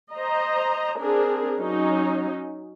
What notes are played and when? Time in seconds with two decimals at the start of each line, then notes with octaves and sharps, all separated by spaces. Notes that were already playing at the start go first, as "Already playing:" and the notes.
0.15 C5 D#5 A#5
0.99 C4 D4 G#4 A#4
1.59 F#3 C#4 D#4